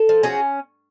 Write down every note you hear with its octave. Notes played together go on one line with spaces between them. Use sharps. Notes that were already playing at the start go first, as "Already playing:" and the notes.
Already playing: A4
F3
C#4 F#4 G#4